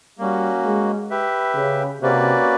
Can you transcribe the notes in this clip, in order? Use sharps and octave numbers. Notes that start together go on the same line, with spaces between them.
G3 A#3 C#4 F#4
G#3
G4 B4 E5
C#3
C3 A#3 C#4 F#4 B4 D5